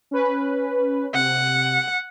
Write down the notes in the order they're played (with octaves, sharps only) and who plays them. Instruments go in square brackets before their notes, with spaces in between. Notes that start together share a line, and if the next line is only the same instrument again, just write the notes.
[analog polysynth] C#4 B4
[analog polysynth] C3 [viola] F#5